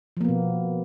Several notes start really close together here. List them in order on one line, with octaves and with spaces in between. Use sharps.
F3 A#3 B3 B2